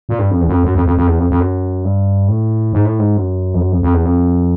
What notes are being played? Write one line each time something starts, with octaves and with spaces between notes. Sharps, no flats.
A#2
G2
F2
E2
F#2
F2
F#2
F2
F2
F2
E2
F2
F2
F#2
G2
A2
G#2
A2
G#2
F#2
F2
F#2
F2
F2
E2
F2